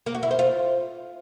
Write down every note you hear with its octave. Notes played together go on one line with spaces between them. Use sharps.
A#3
F#4
E4
C5
F4